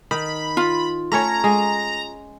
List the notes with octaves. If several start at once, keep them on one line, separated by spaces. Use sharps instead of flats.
D#3 B5
F4
A3 C#4 C#5 A#5
G#3